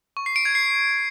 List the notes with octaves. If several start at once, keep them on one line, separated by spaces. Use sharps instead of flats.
C#6
C7
D7
G#6
C7